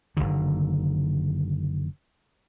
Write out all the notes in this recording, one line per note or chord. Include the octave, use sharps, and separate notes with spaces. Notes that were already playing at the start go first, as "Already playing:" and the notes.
F#1 D2 D3 D#3